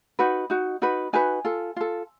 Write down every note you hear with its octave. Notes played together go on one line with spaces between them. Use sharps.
D#4 F#4 B4
D#4 F#4
D#4 F#4 B4
D#4 F#4 B4 G#5
F4 A4
F4 A4